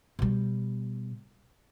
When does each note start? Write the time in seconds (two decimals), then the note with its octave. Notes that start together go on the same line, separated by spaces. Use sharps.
0.19 B2 G3